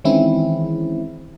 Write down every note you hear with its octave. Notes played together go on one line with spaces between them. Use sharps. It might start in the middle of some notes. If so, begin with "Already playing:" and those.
D#3 E3 G#3 C4 C#4 E4